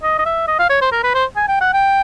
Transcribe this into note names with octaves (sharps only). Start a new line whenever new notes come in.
D#5
D#5
E5
D#5
F5
C#5
C5
A#4
B4
C5
G#5
G5
F#5
G5